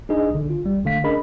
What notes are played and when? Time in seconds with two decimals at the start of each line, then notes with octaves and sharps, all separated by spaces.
0.09 D4 D#4 G#4 D#5
0.31 A#1 D3
0.50 F4
0.64 A1 G3
0.85 A#1 D3 A3 F5 B6
1.04 C#4 D4 G#4 A#4 D#5 B5